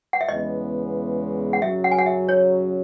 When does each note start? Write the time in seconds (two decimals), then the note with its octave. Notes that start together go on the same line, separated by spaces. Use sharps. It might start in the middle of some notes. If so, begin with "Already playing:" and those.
0.13 F#5
0.21 E5
0.29 E2 C#3 E3 G#3 B3 D#5
1.53 F#5
1.61 F#2 C#3 F#3 E5
1.84 F#5
1.91 G#5
1.99 F#5
2.06 E5
2.29 C#5